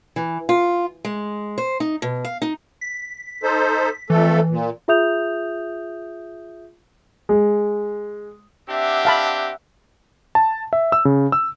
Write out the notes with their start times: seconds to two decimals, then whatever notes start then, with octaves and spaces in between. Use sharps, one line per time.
0.16 E3
0.49 F4
1.05 G#3
1.58 C5
1.80 D#4
2.02 B2
2.24 F5
2.42 D#4
2.81 B6
3.43 D#4 A4 C5
4.10 F2 E3 A3 A4
4.49 A#2
4.88 F4 G#4 E5 D#6 G6 F7
7.29 G#3
8.70 C4 D4 G4 E5 F#5
9.05 F5 A5 B5
10.35 A5
10.73 E5
10.92 E6
11.05 C#3
11.32 E6